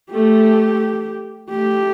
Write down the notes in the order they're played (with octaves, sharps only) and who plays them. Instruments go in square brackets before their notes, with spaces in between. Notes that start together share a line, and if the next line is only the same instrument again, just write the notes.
[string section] A3 [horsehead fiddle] G4
[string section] A3 [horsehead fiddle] G4